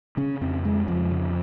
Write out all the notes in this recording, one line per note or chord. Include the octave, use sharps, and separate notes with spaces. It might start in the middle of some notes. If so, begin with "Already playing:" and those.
C#3 C#4
F2 C4
C#3 G#3
F2 F3
C#3